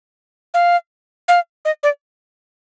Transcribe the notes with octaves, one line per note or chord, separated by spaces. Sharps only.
F5
F5
D#5
D5